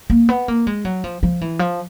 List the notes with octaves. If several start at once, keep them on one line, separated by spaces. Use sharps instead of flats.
A#3
B3
A#3
G#3
F#3
F3
F3
E3
F3